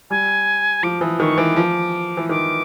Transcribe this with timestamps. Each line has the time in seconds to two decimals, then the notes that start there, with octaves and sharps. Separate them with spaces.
0.10 G3 G#5
0.83 F3 D6
1.01 E3 D#6
1.19 D#3 C#6
1.38 E3 D6
1.56 F3
2.17 E3
2.29 D#3 D6